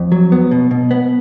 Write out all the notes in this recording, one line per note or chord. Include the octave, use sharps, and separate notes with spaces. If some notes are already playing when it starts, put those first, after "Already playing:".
Already playing: F2
F#3
B3
B2
B2
B3